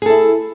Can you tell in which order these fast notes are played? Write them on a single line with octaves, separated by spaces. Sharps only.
G#4 A4 E4